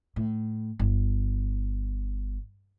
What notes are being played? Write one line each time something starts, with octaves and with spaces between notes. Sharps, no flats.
A2
G1